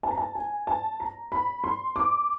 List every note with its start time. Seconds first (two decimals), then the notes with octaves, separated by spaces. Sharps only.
0.03 A5
0.11 A#5
0.18 A5
0.35 G#5
0.67 A5
1.00 A#5
1.32 B5
1.64 C6
1.96 D6